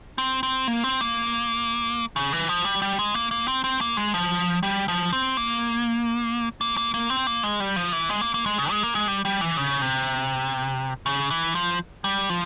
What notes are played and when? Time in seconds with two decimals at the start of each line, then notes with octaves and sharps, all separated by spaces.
0.18 C4
0.43 C4
0.67 A#3
0.84 C4
1.01 A#3
2.16 C#3
2.33 E3
2.49 F3
2.65 G3
2.82 G3
2.99 G#3
3.14 A#3
3.31 A#3
3.48 C4
3.64 C4
3.81 A#3
3.97 G#3
4.14 F3
4.63 G3
4.88 F3
5.13 C4
5.37 A#3
6.61 A#3
6.77 A#3
6.94 A#3
7.10 C4
7.27 A#3
7.43 G#3
7.60 G3
7.76 F3
7.93 E3
8.09 G#3
8.21 A#3
8.34 A#3
8.46 G#3
8.58 C#3
8.71 G#3
8.83 A#3
8.95 G#3
9.08 G3
9.25 G3
9.41 E3
9.57 C#3
9.82 C3
11.06 C#3
11.30 E3
11.55 F3
12.04 G3
12.30 F3